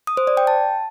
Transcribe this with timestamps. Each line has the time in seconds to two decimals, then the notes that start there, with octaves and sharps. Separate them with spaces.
0.07 D#6
0.17 C5
0.27 D5
0.37 G5
0.47 A5